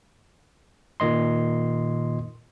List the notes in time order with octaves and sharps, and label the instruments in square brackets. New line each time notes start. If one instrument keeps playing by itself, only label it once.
[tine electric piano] A#2 D#3 D#5 C6